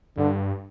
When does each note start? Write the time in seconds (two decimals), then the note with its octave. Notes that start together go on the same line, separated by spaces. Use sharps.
0.17 G2 D3